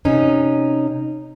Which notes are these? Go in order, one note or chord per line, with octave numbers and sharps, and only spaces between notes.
C3 C#4 D#4